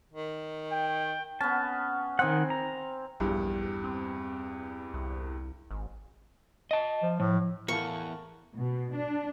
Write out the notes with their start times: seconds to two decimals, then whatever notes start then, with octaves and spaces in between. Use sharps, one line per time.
0.13 D#3
0.71 G5
1.41 B3 C#4 A5
2.19 D#3 C4 D#4 F#5 G#5
2.50 A#5
3.20 A#1 E2 G2
3.84 C4
4.94 C2
5.71 G#1
6.71 D#5 A5
7.02 F3
7.20 A2 F3
7.68 E2 A2 A#4 F5 A5 C#6
8.57 B2
8.94 D4